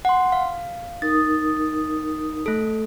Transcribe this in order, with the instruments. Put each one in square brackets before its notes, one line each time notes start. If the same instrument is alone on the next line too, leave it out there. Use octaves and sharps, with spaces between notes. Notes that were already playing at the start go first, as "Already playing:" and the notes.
[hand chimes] F#5 C6
F5
[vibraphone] D#4 A#4 D#6 [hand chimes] A6
[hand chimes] A3 A4